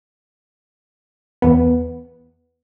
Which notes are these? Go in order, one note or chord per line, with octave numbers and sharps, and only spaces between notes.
E2 B3